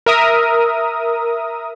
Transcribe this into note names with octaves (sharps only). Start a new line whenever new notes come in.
A#4 E5 D#6